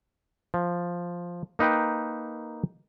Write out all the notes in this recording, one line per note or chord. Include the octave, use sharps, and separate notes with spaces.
F3
A#3 D#4 B4 G5